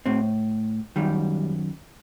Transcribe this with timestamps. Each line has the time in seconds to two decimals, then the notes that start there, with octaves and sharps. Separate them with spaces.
0.06 A2 C4
0.96 F#2 D#3 G3